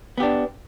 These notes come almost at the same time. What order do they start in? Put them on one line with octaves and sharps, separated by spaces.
B3 G4 D4